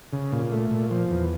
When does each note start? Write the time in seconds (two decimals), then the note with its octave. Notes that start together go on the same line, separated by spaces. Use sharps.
0.12 C#3
0.32 A#2
0.52 A3
0.71 A#2
0.91 F3
1.11 E2